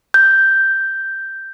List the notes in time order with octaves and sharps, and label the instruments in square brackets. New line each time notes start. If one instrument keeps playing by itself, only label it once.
[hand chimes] G6